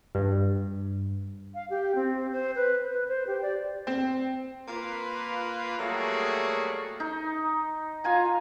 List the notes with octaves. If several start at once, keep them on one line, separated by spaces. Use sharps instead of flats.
G2
F5
G4
C4
C5
B4
B4
C5
G4
D5
C4
A#3 F4 B4
F#3 G3 A3 A#3 F#4 G#4
D#4
F4 G#5 A#5